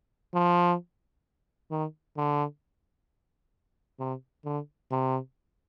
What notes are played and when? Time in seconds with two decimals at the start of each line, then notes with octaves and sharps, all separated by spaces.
0.34 F3
1.71 D#3
2.17 D3
3.99 C3
4.45 D3
4.91 C3